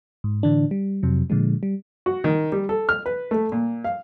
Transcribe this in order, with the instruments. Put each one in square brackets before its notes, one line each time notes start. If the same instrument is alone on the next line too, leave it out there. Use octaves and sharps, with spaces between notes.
[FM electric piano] G#2
A2 D3 E3 D4
G3
F2 C3 F#3
A#2 D3 F3 G#3
G3
[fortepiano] F#4
D#3
G3
A4
F6
B4
A3
A#2
F5